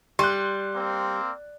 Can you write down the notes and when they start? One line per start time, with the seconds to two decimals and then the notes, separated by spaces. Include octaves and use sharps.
0.19 G3 C6 F#6
0.75 A#3 C4